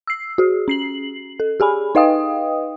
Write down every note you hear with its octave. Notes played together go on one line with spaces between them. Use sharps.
E6 C7
F#4 G#4
C#4 C7 F#7
A4
G4 G#4 G#5 B5
D#4 B4 D#5 F5 G5 D#6